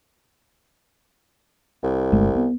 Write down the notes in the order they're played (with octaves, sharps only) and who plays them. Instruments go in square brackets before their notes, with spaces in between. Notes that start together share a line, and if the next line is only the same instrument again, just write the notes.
[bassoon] C2
[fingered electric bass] G1 G#3 A3
B3